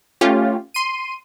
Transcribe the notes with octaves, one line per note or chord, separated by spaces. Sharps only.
A3 C#4 F4 G4
C6 D#7